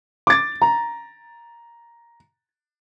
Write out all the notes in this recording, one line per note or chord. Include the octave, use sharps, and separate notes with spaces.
D6 A6
A#5